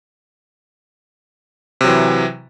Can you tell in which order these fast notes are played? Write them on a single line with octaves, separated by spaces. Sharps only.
C3 F#3 E3